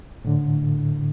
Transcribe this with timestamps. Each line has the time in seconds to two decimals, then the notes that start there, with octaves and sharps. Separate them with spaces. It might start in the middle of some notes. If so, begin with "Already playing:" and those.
0.25 A2 D3